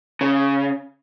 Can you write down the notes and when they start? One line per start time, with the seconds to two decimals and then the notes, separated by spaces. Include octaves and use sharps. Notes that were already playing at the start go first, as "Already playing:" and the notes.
0.21 C#3